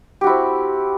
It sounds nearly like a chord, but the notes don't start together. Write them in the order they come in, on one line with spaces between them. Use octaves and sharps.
G4 F#4 E4 C4